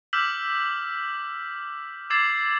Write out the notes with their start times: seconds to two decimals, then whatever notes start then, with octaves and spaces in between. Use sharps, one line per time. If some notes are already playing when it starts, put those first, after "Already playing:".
0.13 D6 E6 F6 G6 B6 F#7
2.10 D6 E6 G#6 A6 C7 F#7